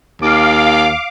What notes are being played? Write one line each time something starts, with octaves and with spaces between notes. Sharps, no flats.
D#2 F5 D6